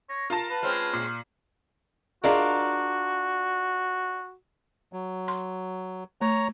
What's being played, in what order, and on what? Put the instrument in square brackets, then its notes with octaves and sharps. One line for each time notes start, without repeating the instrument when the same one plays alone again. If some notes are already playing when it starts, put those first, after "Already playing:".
[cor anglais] C#5 [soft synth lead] A#6
[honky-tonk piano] F4 A5 [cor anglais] A#4
[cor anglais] B4
[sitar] G#3 C4 C#4 [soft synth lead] F6
[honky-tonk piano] A#2 C7
[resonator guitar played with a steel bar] D4 F4 A#4 [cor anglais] F#4 [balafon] G#4 D5 D#5
[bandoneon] F#3
[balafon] C6
[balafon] A3 [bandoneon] C#5 A#5